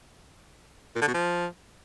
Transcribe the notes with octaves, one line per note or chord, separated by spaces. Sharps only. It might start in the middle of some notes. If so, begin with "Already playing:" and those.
A#2
D3
B2
F3